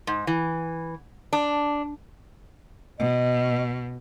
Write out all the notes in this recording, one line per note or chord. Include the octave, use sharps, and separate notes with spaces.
G#2
E3
D4
B2 D#5